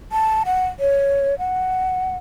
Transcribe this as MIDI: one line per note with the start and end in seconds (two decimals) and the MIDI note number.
0.12 0.43 81
0.46 0.67 78
0.80 1.35 73
1.39 2.16 78